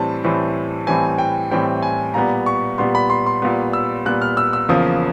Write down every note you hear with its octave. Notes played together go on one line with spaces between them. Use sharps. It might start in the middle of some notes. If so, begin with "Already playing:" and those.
Already playing: A2 E3 G3 C4 A5
A2 E3 G3 C4
A2 E3 G3 C4 G#5
G5
A2 E3 G3 C4 G5
G#5
A#2 G3 B3 A#5
C#6
A#2 G3 B3 C6
B5
C6
C6
A#2 G3 B3
E6
A#2 G3 B3 F#6
F6
E6
E6
E2 C#3 F3 A#3 D#6